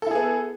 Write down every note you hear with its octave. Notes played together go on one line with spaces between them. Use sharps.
B3 E4 G#4 A4